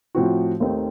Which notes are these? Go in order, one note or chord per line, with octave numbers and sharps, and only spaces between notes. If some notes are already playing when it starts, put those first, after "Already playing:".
A2 F3 C4 F#4
D#2 D#3 A3 C4 D#4